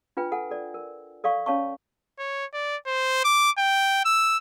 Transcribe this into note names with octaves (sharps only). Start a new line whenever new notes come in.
D4 F4 B4 G5
A4 F#5 G#5
A4 D5
A#4
A4 D5 F5 C#6
C#4 C#5 F5 A5 C#6
C#5
D5
C5
D6
G5
E6